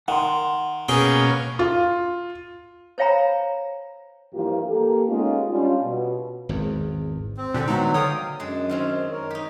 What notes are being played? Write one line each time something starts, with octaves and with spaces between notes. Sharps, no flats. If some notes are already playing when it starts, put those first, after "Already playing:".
D#3 F#5 C6
B2 A#3 C#4 G#4 G5
F4
C5 C#5 F5 G5 A#5 B5
G2 E3 F3 A#3 F4 G4
A#3 G4 A4
G#3 B3 C#4 D#4 F4 G4
G3 C#4 D4 F4
B2
G#1 E2
C4
A#2 D3 D4 G4
D#3 F#3 G#3 B3 D#4 E5
D3 C#5 D5 F5 G5 D#6
F#2 G#3 D4
D#3 C4 C#4
A#4 C#5
D#4 G4